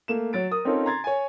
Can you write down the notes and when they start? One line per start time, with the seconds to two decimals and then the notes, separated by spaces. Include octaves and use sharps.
0.08 A3 A#3 E7
0.33 F#3 A6 D7
0.51 A#4 D#6
0.65 C4 C#4 D#4 F4 A4 A#4
0.86 A#5 C6 G#6 A6
1.04 C#5 G#5